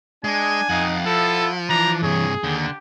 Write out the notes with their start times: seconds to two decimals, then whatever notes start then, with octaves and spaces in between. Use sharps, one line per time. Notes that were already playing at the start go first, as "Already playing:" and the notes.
0.24 G#3 D4 G#5
0.69 F2 D#4 F5 F#5
1.05 F3 E4 A4
1.69 E3 D4 A#5
2.03 G2 C3 G#4 C#5
2.44 D#2 D3 G4